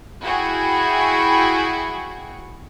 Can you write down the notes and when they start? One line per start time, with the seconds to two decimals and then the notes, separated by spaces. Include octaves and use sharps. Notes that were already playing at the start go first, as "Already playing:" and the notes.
0.22 E4 F#4 G#4 G5 C#6